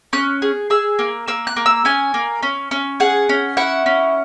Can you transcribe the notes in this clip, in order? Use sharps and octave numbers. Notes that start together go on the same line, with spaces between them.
C#4 F#6
G#4
G#4 E6
A#3
A#3 E6
F#6
A#3
E6
C#4 G#5
A#3
C#4
C#4
G#4 F#5
C#4
E4 F#5
C#4